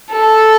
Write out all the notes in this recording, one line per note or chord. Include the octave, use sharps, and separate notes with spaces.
A4